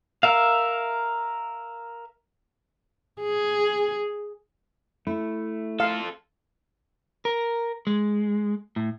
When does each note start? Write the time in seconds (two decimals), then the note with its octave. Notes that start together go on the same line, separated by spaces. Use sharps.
0.23 A#4 E5 F5
3.22 G#4
5.07 A3 E4
5.80 F4 A4 F5
7.25 A#4
7.87 G#3
8.76 A2